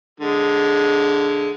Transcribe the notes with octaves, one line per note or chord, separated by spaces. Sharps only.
D3 G#3